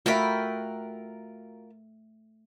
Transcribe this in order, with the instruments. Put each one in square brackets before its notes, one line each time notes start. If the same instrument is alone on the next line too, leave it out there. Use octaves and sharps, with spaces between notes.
[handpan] A3 E5 [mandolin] F4 A#4 B5 [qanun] F#4 G5